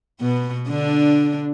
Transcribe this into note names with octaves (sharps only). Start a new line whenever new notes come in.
B2 B3
D3 D4